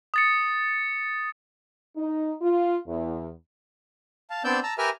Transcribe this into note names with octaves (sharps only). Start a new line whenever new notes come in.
D#6 A6 C#7
D#4
F4
E2
F5 A5
B3 C4 D4 D5 E6 G6
A5 A#5 E6
G4 A#4 B4 E5 G#5 F6